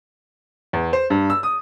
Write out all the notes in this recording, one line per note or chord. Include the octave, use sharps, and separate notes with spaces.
E2
C5
G2
E6
D#6